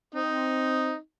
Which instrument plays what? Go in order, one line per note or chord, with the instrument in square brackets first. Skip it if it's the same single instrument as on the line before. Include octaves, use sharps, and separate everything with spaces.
[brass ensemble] C4 [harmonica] D#4